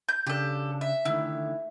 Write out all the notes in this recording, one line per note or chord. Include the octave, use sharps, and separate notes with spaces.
G6
C#3 D4 G4 A4
E5
D3 D#3 A3 E4